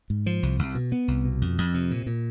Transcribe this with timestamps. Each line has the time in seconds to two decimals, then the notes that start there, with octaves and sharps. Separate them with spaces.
0.10 G#2
0.26 F3
0.43 C2
0.59 C2
0.75 B2
0.92 B3
1.08 C2
1.25 B2
1.42 F2
1.58 F2
1.74 C3
1.91 A#2
2.06 A#2